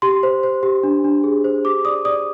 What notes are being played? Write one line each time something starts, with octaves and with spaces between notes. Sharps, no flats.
G4 C6
C5
C5
G4
D4
D4
G#4
C5
G4 D6
D5 D#6
D5 D#6